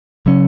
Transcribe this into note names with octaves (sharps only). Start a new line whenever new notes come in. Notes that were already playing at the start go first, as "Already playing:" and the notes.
C#3 F#3 C#4